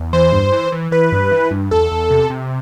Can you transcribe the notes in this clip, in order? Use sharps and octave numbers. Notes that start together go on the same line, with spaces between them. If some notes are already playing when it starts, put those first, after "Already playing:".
Already playing: E2
E3 C5
G2
E3
E3
E3 B4
G2
E3
G2
E2 A4
E2
C3
C3